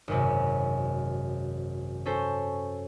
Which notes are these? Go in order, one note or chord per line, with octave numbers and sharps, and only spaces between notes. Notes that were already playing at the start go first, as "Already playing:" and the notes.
G#1 F#2 C3
C#4 A4 C5